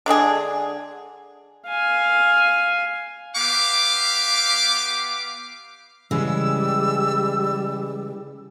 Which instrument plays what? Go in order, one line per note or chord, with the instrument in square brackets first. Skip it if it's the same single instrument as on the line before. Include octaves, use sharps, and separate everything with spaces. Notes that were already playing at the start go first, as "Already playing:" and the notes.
[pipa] D3 G#3 D4 G#4
[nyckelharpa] F5 G#5
[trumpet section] B3 G4 F5 D6
[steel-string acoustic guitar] C#3 E3 G#3 [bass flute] G3 [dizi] E6